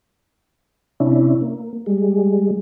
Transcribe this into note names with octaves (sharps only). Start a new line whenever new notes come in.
C3 C#4 D4 E4
A#3
G3 G#3